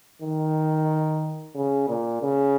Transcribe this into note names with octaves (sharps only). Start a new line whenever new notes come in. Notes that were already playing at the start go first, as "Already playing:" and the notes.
D#3
C#3
A#2
C#3